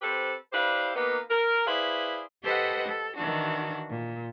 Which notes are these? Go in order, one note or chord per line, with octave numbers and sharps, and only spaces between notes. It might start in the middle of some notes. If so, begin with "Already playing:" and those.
C4 G4 A4 B4 C5
D4 E4 G4 B4 C5 F5
A#3 B3 D#4 G4 B4
A#4
E4 G#4 B4 C5 D5 F5
G4 A4 B4 C5 D#5 F#5
A4
D#3 E3 D4 F#4
A#2